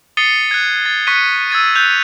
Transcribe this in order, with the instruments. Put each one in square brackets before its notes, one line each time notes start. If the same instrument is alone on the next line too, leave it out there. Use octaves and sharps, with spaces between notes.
[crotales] D#6 A6 C7 C#7 D#7 G7
F#6 G#6
A6
C#6 F#6 B6 C#7 D#7
E6 G#6 A6 D#7
F#6 G6 F7